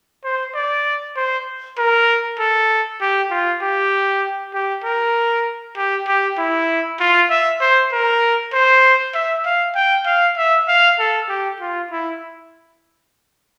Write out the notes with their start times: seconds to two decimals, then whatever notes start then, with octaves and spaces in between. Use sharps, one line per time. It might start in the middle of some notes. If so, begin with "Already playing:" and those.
0.24 C5
0.54 D5
1.17 C5
1.78 A#4
2.39 A4
3.01 G4
3.31 F4
3.62 G4
4.54 G4
4.84 A#4
5.77 G4
6.07 G4
6.38 E4
7.00 F4
7.30 E5
7.61 C5
7.92 A#4
8.53 C5
9.15 E5
9.46 F5
9.75 G5
10.06 F5
10.37 E5
10.68 F5
10.99 A4
11.29 G4
11.60 F4
11.91 E4